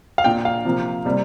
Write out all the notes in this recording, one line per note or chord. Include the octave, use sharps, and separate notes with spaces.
F5
A#2 A#3 G5
F5
C3 F3 A#3
C3 G3 A#3